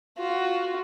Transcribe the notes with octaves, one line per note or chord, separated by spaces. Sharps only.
F4 F#4